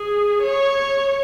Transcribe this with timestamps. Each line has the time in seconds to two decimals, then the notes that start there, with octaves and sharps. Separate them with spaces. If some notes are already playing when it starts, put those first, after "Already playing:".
Already playing: G#4
0.43 C#5